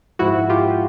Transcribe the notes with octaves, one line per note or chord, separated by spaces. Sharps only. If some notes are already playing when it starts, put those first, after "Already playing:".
G#2 F3 G#3 E4 F#4
F4 G4